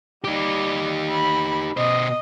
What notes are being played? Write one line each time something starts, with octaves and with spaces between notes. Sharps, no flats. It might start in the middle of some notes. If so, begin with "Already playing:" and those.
G3 D#4 G4
B5
B2 C5 D#5